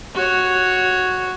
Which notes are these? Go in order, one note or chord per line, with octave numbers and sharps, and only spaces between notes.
F#4 C#5